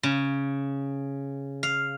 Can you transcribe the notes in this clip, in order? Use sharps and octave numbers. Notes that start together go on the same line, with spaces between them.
C#3
F5